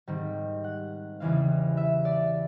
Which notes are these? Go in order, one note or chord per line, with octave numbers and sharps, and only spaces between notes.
G#2 D#3 G3 C4
F#5
E2 C#3 E3 G3 C4 F5
E5
D5